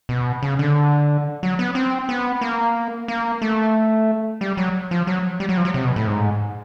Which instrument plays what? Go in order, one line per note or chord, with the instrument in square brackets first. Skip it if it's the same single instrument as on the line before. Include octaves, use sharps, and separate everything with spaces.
[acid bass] B2
C#3
D3
F#3
B3
C4
B3
A#3
A#3
A3
G3
F#3
F3
F#3
G3
F#3
F3
F#3
C3
B2
A2
G#2